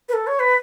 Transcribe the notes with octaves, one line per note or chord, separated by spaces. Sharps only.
B4
A4
C#5
B4